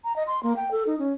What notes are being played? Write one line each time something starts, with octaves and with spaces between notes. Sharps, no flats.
A#5
D#5
C6
A#3
G5
A4
D#4
C#4